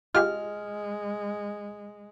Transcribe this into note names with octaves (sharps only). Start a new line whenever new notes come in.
G#3 F4 G4 G#4 D#5 F6